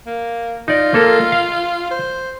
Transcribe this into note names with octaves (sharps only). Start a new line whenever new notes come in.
A#3
D#4 F4 D5
A#3 A4
F5
C5